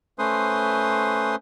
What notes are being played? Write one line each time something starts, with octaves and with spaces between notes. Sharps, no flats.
A3 C#4 B4 C5 C6 D#6